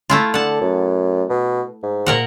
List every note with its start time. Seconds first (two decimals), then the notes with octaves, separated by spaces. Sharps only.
0.10 A3 E4 F4
0.34 D3 F#5 A5
0.61 F#2
1.30 B2
1.83 G#2
2.06 A#2 A#4 F#5